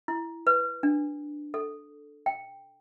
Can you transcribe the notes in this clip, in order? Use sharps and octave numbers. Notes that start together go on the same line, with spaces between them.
E4
B4
D4
A4
G5